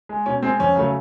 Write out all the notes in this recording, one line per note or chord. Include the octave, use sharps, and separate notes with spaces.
G#3
B2 C#4
G#3 C4
F2 C#4
C#3 F#3 A3